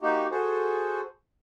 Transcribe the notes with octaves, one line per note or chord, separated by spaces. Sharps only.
A#3 D#4 F#4 G4
F#4 G#4 A4 C5